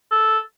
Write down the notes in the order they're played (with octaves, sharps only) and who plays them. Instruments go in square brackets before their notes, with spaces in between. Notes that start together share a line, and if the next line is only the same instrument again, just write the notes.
[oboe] A4